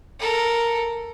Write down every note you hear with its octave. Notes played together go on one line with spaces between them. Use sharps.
A4 A#4